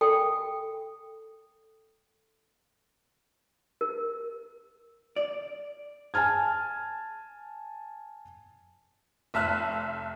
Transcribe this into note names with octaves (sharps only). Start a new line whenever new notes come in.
A4 G5
A#4
D5
G#5 A5 F6 G#6
F1 E5 A5 F6 F#6